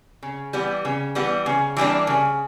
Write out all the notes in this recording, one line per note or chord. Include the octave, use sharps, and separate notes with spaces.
C#3
E3 G3 B3
C#3
E3 G3 B3
C#3
E3 G3 A#3 D4
C#3